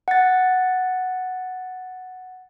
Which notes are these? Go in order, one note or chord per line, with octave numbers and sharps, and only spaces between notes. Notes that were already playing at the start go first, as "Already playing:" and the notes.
F#5 A6